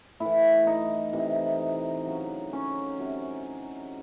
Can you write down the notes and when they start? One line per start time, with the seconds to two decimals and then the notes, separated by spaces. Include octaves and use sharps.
0.20 A2 E3 E4
0.67 D#4
1.13 C3 E3
2.06 C#3 F#3
2.53 C#4
3.00 C3 F#3